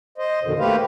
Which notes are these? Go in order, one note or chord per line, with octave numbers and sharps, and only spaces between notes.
C5 D#5
F2 B2 D3 D#3
A3 A#3 G4 B4 C5 F5